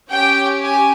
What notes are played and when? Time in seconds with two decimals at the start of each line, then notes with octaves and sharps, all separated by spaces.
0.11 C#4 G4 G5
0.63 G#5